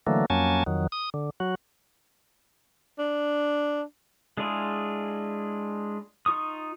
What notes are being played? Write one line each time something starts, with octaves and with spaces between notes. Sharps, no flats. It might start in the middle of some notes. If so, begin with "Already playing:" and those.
D3 E3 F#3 A3 A#3
F2 F#3 A#3 C#4 G#5 A5
F2 D#3 F#3
D#6
D3
F#3 F#4
D4
G#3 D4 E4 F4 G#4
D#4 F4 C#6 D#6